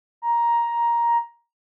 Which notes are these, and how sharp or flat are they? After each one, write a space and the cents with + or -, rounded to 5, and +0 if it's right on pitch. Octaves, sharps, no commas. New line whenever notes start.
A#5 +10